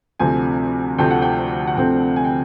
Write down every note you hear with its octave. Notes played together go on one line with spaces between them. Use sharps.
D2 C3 F3 A3 C4 G#5
D2 C3 F3 A3 C4 G5
F#5
G5
F#5
D2 C3 F3 A3 C4 G5
G#5
G5